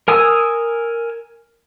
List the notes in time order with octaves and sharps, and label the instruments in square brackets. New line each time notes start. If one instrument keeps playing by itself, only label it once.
[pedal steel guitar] A#4 G#5 D#6 E6